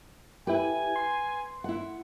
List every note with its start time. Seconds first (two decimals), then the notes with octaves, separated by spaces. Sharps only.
0.47 E4 G4 B4 G#5
0.96 C6
1.64 E4 F#5